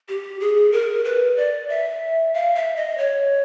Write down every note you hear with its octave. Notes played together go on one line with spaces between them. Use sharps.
G4
G#4
A#4
B4
D5
E5
F5
E5
D#5
C#5